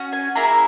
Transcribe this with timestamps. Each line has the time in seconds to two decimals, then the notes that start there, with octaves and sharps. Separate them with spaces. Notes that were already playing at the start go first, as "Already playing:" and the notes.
Already playing: C#4 F#4
0.13 G#5
0.35 A#3 E4 G#4 A#5